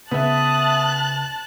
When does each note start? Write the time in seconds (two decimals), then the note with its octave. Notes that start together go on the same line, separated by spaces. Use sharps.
0.11 C#3 B3 E5 A5 D#6 F#6